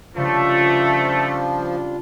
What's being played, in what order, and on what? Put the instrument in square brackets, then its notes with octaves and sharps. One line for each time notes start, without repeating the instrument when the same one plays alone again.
[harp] C#2 C#3 [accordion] F3 [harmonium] G3 D4 F4 [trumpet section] A3